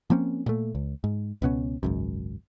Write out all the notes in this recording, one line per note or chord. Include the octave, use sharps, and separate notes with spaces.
F3 A#3 C4 C#4
A#2 A3
C#2
G#2
C#2 B2 B3 C#4
G#1 C#2 F#2